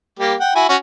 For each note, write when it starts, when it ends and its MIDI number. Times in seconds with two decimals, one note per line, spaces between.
0.19 0.34 55
0.19 0.34 58
0.19 0.34 67
0.40 0.51 78
0.40 0.51 79
0.55 0.67 64
0.55 0.67 66
0.55 0.67 80
0.69 0.76 61
0.69 0.76 66
0.69 0.76 73